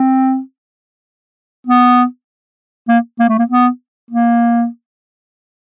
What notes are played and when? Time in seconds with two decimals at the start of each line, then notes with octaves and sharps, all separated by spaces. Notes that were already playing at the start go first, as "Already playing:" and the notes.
Already playing: C4
1.67 B3
2.88 A#3
3.20 A#3
3.29 A3
3.38 A#3
3.49 B3
4.11 A#3